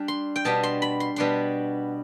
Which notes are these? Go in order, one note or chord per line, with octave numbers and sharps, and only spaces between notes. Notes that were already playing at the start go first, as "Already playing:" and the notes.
Already playing: G3 D4
C6
G5
B2 G3 B3 D4 A5
C6
B5
C6
B2 G3 B3 D4 C6